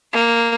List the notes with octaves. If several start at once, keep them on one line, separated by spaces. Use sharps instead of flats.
A#3